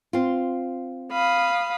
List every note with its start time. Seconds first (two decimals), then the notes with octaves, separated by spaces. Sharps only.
0.13 C4 F4
1.12 F5 B5 D#6